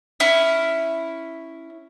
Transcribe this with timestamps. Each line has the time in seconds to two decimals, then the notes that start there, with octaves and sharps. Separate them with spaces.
0.20 C#4 E4